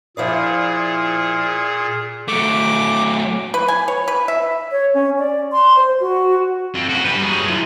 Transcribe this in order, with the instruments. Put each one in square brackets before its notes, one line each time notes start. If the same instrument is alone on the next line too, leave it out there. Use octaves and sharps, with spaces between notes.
[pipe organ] A#2 G#4 [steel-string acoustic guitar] F3 E4 D5
[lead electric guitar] F#3 A3 [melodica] D6
[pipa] B4
G#5
C#5
B4
E5
[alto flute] C#5
C#4
D5
C6
C5
F#4
[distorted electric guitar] F3 C4
C#4 F#4
G3 B4
F#3 G#4
E3 F3